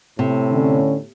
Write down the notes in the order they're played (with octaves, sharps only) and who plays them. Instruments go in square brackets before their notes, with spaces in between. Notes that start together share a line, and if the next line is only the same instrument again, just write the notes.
[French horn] A2 [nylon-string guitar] C3
[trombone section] D3 C#4